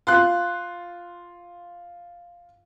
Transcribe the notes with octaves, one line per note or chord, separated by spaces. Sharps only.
F4 C6 F#6